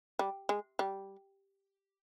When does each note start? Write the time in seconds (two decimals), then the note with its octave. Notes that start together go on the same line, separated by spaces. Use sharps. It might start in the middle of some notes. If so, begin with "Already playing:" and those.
0.19 G3
0.49 G#3
0.79 G3